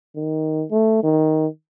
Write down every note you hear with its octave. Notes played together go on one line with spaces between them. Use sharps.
D#3
A3
D#3